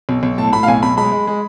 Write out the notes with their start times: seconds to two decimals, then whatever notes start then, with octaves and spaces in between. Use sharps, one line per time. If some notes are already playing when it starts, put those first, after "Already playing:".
0.09 B1
0.23 B1
0.38 A2 A5
0.53 A2 B5
0.63 F5
0.68 B1 G#5
0.83 B1 B5
0.97 G#3 B5
1.12 G#3
1.27 G#3